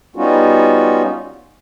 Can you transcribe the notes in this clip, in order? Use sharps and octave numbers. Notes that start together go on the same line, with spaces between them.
G3 B3 C#4 D#4 F4 F#4